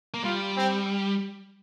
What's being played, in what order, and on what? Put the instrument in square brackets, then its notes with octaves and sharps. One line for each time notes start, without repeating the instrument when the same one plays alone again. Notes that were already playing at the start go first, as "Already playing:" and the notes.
[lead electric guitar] A#3
[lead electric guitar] G3 [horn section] F4
[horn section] C4